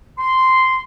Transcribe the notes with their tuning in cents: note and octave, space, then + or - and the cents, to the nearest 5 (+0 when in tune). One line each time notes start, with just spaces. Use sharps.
C6 -10